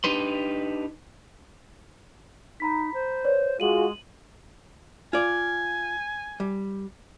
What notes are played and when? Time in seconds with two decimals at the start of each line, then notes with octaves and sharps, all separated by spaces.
0.04 D4 D#4 G4 B4 C6
2.60 D#4 A#5 B5 B6
2.93 C5
3.24 B4 C#5 D5
3.60 G#3 F4 F#4 G#4 D#7 F#7
5.13 F4 D5 G#5
6.40 G3